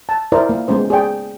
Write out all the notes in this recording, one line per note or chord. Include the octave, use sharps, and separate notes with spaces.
A5
E4 A#4 C5 D5
A#3
G#3 B3 C#4 C5
G#4 D5 G5